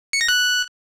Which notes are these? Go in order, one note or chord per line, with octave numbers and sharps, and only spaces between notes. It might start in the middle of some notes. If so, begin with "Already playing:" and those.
C#7
A#6
F#6